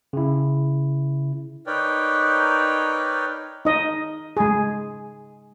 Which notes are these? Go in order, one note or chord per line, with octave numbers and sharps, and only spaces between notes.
C#3 E4
D#4 A#4 B4 C#5 D5 G5
D#4 D#5
G#3 G#4